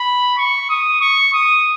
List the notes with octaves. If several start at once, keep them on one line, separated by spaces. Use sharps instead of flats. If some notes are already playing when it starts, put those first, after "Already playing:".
Already playing: B5
C#6
D#6
C#6
D#6